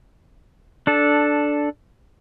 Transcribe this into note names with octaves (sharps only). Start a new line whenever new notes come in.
D4 A4